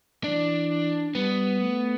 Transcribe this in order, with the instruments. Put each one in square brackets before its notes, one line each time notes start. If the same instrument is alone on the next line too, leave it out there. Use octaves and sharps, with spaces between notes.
[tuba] E3 [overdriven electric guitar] D4
[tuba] G3 [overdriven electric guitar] B3
[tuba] A3